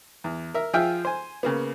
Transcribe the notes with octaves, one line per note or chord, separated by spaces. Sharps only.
E2
A#4 E5
F3 F4 G#4 E5 G5 F6
C5 G#5
C#3 A#3 B3